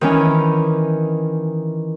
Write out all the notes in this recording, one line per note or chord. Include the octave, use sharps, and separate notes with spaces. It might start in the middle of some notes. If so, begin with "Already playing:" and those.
D#3 E3 C#4